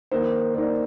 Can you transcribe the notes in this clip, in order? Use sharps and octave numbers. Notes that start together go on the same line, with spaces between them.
D#3 A#3 D#4 C5
D#3 A#3 D#4 D5